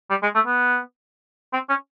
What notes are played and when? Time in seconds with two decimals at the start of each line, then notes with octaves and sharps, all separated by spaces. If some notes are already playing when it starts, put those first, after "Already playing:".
0.10 G3
0.23 G#3
0.35 A3
0.47 B3
1.53 C4
1.69 C#4